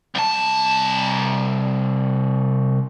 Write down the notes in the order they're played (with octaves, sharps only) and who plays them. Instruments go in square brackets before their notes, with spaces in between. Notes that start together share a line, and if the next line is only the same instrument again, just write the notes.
[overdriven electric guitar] C2 A5